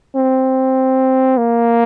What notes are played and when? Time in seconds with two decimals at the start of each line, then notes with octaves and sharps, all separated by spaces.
0.16 C4
1.37 A#3